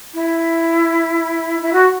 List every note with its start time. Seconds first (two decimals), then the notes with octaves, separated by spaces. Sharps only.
0.14 E4
1.61 E4
1.73 F#4